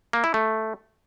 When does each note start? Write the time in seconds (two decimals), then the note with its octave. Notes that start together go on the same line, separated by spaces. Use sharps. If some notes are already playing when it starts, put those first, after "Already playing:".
0.13 A#3
0.24 E4
0.34 A3